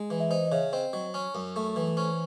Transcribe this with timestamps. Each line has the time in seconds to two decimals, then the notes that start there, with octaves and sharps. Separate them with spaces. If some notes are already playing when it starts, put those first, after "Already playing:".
Already playing: G#3
0.10 E3
0.20 E5
0.30 D#4 C5 D#5
0.47 D#5
0.52 C#3 C#5 E5
0.72 C4 C5 D#5
0.93 F#3 C5 D#5
1.14 C#4 C#5
1.35 F#2
1.56 A3
1.76 E3
1.97 C#4 C5